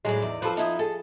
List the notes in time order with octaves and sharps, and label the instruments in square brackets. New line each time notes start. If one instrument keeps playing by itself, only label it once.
[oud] A2 F#3 G#3 [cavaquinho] D#4 D5
[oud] E2
[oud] F3 C4 A4 [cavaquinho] B4 C5
[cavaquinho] D#4 E4 D#6
[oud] G#4 [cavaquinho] A4